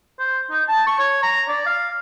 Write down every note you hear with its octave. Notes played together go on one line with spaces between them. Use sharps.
C5
D#4
A5
C#6
C#5
A#5
D5
F5